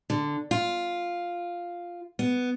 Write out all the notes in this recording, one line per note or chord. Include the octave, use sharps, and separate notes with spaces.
D3
F4
B3